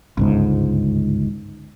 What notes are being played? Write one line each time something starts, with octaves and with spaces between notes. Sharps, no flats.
G1 C#2 G#2